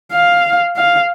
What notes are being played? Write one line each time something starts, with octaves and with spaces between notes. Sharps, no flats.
F5
F5